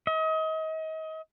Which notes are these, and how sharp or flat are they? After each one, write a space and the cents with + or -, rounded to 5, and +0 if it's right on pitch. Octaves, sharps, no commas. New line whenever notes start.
D#5 +35